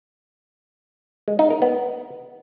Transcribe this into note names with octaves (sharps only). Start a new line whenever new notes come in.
G#3
D#4
A#4
B3